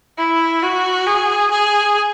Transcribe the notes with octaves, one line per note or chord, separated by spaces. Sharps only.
E4
F#4
G#4
G#4